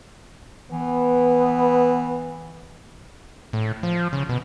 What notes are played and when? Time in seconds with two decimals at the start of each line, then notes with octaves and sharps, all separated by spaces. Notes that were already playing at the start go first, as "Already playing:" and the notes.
0.72 E3 B3
3.53 A2
3.83 F3
4.13 C#3
4.29 B2